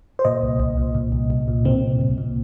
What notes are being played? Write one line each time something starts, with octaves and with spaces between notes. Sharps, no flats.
C5
A#2 D#5
C2
C2
A#2
A#2
C2
C2
A#2
A#2 C4
C2
C2
A#2